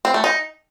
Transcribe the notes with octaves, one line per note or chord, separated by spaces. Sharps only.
C4
A3
D#4